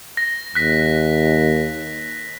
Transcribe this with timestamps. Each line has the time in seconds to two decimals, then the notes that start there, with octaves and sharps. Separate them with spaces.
0.17 A#6
0.55 D#2 F#6 B6